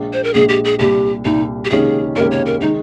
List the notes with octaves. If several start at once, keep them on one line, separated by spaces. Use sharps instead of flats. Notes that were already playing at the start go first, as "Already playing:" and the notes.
Already playing: A#1 A#2 G#3
C5
A#4
A#1 A#2 G#3 G#4
G4
G#4
C2 A#2 G3 G4
C2 A#2 G3 D#4
G4
C#2 C3 D#3 A#3 C#4 G#4
C#2 C3 D#3 A#3 C#4 A#4
C#5
A#4
D#3 G#3 D#4